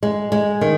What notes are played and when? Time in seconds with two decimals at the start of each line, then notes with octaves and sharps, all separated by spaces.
0.03 G#3
0.32 G#3
0.61 D#3